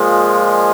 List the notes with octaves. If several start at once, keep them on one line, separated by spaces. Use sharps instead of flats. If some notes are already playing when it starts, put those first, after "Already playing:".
Already playing: A#2 F3 G#3